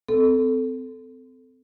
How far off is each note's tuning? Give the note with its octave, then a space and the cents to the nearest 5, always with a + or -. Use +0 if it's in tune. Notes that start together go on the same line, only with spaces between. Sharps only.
C4 -30 A4 +0